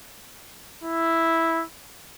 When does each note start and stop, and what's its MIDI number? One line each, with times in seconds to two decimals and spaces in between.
0.84 1.64 64